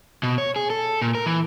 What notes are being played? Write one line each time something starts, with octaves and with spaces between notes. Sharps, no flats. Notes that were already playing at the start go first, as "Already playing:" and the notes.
B2
C#5
G#4
A4
A#2
A#4
E3